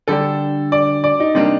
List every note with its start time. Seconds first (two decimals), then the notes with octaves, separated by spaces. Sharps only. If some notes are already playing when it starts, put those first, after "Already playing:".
0.08 D3 G3 D4 A4
0.72 D5
1.04 D5
1.20 D#4
1.35 C3 G3 A#3 D4 D#4